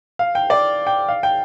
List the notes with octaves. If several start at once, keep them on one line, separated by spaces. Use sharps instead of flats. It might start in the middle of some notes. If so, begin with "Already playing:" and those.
F5
G5
D5
G5
F5
G5